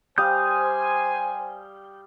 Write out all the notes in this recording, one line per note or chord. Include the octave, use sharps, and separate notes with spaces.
G3 C5 F5 G#5 D#6 G6